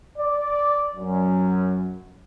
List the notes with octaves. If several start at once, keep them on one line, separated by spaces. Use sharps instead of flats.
D5
F#2